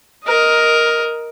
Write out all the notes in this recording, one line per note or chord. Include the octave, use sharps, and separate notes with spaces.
A#4 D#5